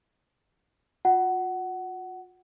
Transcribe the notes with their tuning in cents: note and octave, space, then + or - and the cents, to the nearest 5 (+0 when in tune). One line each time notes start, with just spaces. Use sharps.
F4 +45 F#5 +15